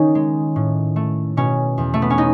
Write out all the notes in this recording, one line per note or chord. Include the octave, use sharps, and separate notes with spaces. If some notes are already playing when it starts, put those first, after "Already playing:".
Already playing: D#3 C#4 D#4
G#3
A2
A3
B2 C#4
E2
A3
B3
C#4
D#4